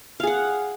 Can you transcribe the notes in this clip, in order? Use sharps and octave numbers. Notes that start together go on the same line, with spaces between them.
G#4 F5 F#5